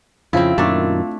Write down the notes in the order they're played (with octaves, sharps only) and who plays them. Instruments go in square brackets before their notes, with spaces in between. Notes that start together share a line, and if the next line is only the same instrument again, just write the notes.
[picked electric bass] F2 C#3 F3 [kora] C4 E4 [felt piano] F4
[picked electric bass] F#2 A#2 D#3 [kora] A3 D4